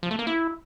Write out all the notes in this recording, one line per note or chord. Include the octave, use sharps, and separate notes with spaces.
F3
A3
A#3
E4